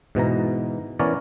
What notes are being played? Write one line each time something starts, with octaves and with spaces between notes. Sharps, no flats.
G#2 B2 E3 A#5
E3 B3 C#4 A#4 C#5 D5